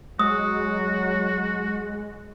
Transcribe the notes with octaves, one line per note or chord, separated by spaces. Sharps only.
F#3 G#3 F#4 D#6